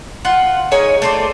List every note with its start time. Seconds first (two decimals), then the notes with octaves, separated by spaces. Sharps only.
0.25 F4 F#5
0.71 D#4 G#4 C#5 G#5
1.02 A3 C5 D5